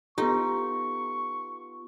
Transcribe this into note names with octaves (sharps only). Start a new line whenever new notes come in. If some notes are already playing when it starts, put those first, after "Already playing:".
B3 D#4 F4 G4 A4 C#6